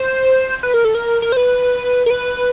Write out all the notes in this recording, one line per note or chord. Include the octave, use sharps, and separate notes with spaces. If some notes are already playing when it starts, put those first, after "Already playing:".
Already playing: C5
B4
A#4
A4
A#4
A#4
C5
B4
A#4
B4